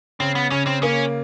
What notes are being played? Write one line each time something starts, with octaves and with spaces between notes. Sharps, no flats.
C#3 C4
B3
C#3 C#4
C4
A#3 C#4